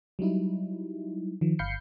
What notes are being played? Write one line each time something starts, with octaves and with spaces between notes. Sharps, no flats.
F#3 G3 D#4 E4
D#3 F3
G1 F5 B5 G6 C7 C#7